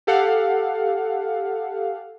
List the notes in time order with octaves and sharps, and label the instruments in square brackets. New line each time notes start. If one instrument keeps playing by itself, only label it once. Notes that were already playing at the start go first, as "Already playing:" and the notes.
[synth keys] G4 A4 F5 F#5